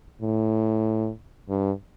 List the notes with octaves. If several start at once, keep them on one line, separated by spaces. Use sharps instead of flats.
A2
G2